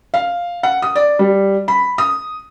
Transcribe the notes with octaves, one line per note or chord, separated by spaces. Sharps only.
F5
F#5
D#6
D5
G3
B5
D#6